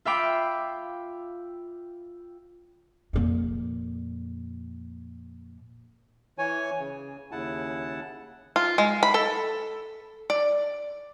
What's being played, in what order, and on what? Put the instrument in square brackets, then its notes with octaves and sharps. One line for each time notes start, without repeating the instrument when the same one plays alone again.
[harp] F4 E5 F5 G5 B5 D6
[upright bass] F2 A#2
[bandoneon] E3 C#5 G#5
C#3
D#2 C#3 E4 F#5 A5
[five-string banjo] F4
G#3
B5
A4
D5